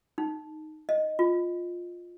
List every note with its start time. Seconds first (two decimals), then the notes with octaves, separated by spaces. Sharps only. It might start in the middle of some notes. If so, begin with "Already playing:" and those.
0.18 D#4
0.89 D#5
1.19 F4